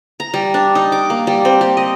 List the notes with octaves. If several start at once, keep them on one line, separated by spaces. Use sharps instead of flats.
A#5
G3
D4
D#4
D6
A#3
G3
C4
G4
D#5